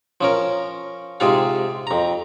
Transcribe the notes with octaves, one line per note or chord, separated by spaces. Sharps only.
F3 C#4 A#4
G#2 C3 F4 G#4 F5
F2 A#5